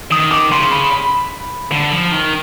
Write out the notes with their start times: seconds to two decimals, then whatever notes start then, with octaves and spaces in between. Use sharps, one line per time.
0.11 D#3 D#6
0.31 D6
0.52 C#3 C6
0.71 B5
0.92 B5
1.72 D3
1.93 F3
2.12 D#3